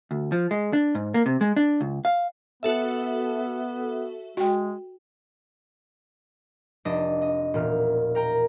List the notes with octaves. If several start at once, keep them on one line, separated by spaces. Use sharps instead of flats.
D2
F3
G#3
D4
G#2
A#3
C3
G#3
D4
C#2
F5
B3 F#4 A4 E5
G#3 F#4 G5
F1 D4 D#5
D#5
E1 A#2 F6
A#4 G5 A#5